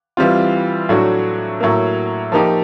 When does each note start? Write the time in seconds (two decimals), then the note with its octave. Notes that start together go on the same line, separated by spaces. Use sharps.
0.17 E3 G3 C4 F4
0.89 A2 F#3 A3 D4 F#4
1.60 A2 F#3 A#3
2.32 F3 A#3 D#4 G4